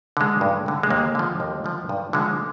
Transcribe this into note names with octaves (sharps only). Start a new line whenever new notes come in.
D3 G#3
G2
D3 G#3
G#3
D#2 A#3
D3 F3
D#2
D3 F3
G2
D3 F3 G#3